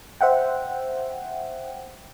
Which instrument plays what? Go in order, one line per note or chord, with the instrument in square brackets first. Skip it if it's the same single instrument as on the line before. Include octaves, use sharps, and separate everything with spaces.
[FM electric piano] C5 E5 F#5 G5